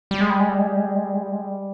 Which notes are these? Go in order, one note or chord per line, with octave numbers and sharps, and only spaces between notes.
G3
G#3
G3
G#3
G3
G#3
G3
G#3
G3
G#3
G3
G#3
G3
G#3
G3